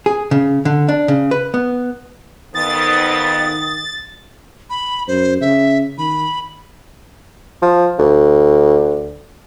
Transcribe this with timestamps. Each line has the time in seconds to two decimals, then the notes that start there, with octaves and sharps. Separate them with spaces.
0.06 G#4
0.31 C#3
0.65 D3
0.88 D4
1.08 C#3
1.31 B4
1.54 B3
2.55 F2 D#3 B3 D#6 A6
4.70 B5
5.08 F#2 C5
5.41 C#3 E5
5.98 D#3 B5
7.62 F3
7.99 D2